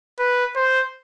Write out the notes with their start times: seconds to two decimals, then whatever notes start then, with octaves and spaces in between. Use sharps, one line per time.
0.19 B4
0.56 C5